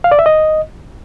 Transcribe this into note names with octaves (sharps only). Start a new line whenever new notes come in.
F5
D5
E5
D#5